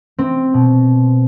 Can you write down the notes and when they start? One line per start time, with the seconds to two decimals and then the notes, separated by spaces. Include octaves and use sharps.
0.19 C4
0.54 B2